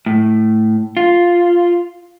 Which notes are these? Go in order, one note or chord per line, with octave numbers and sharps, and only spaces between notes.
A2
F4